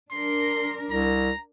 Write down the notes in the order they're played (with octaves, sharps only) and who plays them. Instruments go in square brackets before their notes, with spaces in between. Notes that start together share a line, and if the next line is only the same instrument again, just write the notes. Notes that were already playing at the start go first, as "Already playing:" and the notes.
[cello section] D4 A#4 [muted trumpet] C6
[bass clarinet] C2 [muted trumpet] A#5